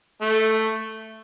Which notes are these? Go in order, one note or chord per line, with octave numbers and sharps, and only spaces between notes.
A3